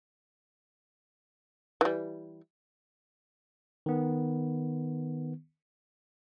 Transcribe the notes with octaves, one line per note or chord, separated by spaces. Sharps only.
E3 G3
D#3 B3